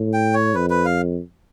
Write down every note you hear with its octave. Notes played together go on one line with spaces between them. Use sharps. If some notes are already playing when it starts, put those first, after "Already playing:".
Already playing: A2
G5
C#5
F2 B4
B4
F5